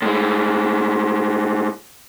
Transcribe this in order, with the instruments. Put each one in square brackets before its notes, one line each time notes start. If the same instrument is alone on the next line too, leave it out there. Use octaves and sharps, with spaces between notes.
[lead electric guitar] A2 G#3